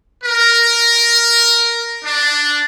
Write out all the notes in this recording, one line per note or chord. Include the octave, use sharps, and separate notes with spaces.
A#4
D4